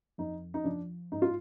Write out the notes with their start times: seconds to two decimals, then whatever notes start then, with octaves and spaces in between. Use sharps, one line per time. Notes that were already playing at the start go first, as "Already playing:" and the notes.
0.18 F2 D#4
0.54 D#4
0.64 F3 D4
1.12 G#2 D#4
1.22 F4